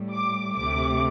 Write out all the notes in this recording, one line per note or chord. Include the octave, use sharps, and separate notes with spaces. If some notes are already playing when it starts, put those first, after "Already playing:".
Already playing: A2 G3
D6
D2 C3 A3 D6